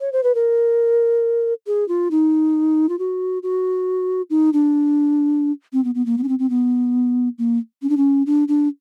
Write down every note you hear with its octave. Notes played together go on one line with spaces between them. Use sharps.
C#5
C5
B4
A#4
G#4
F4
D#4
F4
F#4
F#4
D#4
D4
C4
B3
B3
A#3
B3
C#4
C4
C4
B3
A#3
C#4
D4
C#4
D4
D4